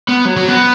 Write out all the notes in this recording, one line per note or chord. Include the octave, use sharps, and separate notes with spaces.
B3
F#3
F#3
B3